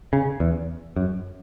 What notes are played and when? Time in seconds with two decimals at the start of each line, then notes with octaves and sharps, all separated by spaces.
0.13 C#3
0.40 E2
0.96 F#2